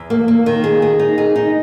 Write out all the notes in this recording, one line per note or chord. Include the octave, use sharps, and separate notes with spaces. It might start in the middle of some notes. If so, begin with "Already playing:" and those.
Already playing: E2
A#3
A#3
D#3
G#4
G#4
D#4
G#4
D#4